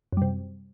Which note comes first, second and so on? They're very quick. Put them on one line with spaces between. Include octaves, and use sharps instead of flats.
F#2 G3 C3